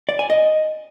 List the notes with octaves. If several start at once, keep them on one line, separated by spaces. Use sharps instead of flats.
D5
G#5
D#5